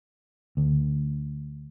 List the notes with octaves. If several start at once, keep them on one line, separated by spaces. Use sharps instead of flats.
D2